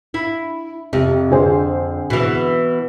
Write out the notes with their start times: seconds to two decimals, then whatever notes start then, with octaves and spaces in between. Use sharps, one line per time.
0.14 E4
0.93 F2 C3
1.31 D3 G#4 C5
2.10 B2 E3